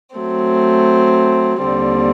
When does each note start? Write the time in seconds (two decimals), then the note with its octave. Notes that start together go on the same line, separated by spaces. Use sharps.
0.15 F#3 A3 C4
1.64 D#2 D3 G3 C4